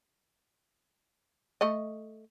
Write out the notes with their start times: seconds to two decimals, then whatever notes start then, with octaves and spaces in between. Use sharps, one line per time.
1.61 A3 D#5